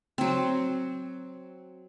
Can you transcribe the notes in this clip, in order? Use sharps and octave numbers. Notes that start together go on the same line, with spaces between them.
F#3 C4